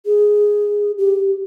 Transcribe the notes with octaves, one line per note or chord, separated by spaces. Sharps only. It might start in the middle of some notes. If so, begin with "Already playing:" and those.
G#4
G4